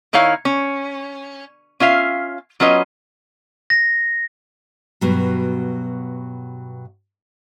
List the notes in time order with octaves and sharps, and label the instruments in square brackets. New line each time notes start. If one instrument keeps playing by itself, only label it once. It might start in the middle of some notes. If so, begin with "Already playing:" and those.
[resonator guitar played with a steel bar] D#3 D#4 E4 C#5 F5
C#4
C#4 F4 E5 F5
F#3 C#4 F4 B4 D#5
[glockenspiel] A#6
[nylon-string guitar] G2 B2 F#3